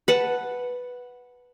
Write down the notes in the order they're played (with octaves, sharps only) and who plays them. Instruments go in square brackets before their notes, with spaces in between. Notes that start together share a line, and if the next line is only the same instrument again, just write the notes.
[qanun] B4 F#5 A5